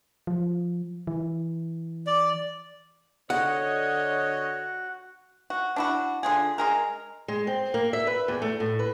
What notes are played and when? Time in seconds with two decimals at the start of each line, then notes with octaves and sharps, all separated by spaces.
0.27 F3
1.07 E3
2.07 D5
3.30 D3 F#4 C#5 D#5 F#5
5.50 F#4
5.76 D4 E4 F#4
6.23 D3 F4 G#4
6.58 G#3 G#4 A#4
7.28 G#3
7.47 C4
7.74 A#3
7.93 E5
8.07 B4
8.28 E2
8.42 A3
8.60 A2
8.79 B4